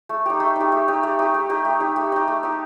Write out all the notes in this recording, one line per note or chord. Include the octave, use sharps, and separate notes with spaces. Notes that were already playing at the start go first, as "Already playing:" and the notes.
A3
D#4 G4
A3
D#4 G4
A3
D#4 G4
A3
D#4 G4
A3
D#4 G4
A3
D#4 G4
A3
D#4 G4
A3
D#4 G4